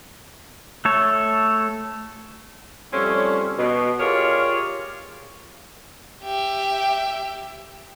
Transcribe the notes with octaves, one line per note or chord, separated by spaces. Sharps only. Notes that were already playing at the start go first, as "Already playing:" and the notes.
A3 A4 C#5
F3 G3 A3 C4 C#4
B2
F4 G4 G#4 A#4 C#5 D5
G4 E5